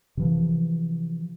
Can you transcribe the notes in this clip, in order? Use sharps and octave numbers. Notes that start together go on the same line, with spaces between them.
C3 E3 F3